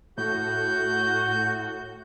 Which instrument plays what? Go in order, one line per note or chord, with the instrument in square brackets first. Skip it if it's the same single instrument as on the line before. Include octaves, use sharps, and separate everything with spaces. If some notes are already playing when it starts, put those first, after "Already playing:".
[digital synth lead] A2 [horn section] F#4 [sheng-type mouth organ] G6